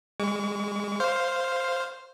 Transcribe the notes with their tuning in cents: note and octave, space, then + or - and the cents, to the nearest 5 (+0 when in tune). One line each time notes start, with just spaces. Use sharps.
G#3 -25 C#6 +40
C5 +0 F5 +0